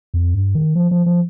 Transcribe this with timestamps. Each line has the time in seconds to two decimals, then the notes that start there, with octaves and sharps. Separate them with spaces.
0.14 F2
0.34 G2
0.55 D#3
0.75 F3
0.91 F3
1.06 F3